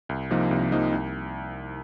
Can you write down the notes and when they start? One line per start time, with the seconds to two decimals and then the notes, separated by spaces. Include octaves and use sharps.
0.09 C2
0.31 C3 F3 A#3 D#4
0.51 C2
0.72 C3 F3 A#3 D#4
0.92 C2